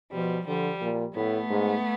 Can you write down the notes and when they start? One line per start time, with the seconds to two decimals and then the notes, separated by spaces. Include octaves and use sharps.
0.12 B2 F3 G3
0.47 D3 F3 G3
0.81 A#2
1.15 A2 A3 B3
1.50 G#2